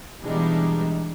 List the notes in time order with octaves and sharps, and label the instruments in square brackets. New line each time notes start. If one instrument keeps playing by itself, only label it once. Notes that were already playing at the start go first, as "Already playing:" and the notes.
[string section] B2 E3 G3 G#3 D4 D#4